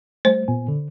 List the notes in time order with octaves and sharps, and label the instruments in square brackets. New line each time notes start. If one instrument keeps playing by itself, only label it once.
[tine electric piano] G3 A3 [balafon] C5
[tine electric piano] A#2 B3 G#5
D3